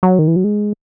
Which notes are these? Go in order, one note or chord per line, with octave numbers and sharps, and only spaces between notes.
F#3
D#3
E3
F#3
G#3